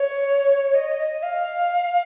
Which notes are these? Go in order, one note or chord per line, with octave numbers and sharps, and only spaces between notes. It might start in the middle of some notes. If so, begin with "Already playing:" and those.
Already playing: C#5
D#5
D#5
F5